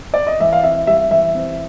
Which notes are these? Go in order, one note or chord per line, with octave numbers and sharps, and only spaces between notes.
D5
D#5
E3 E5
F5
C4 E5
G3 E5
E3 E5
C4